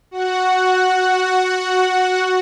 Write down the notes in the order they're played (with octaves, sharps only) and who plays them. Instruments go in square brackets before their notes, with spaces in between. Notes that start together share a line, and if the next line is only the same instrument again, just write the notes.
[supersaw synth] F#4 F#5